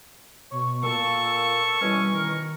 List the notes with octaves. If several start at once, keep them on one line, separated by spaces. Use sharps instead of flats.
B2 C#6
A#2 A4 C#6 E6
B2 E3 G3 C#4
D#3 A#4